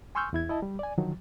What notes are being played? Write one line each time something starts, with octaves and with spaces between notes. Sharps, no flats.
G#5 C6 C#6 E6 F6 G6
E2 E4 G#6
E4 D#5 A5
G3
D5 G#5
D3 D#3 F3 F#3